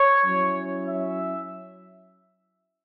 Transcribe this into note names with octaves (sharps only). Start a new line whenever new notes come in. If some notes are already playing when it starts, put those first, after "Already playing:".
Already playing: C#5
F#3 C#4 E4
E5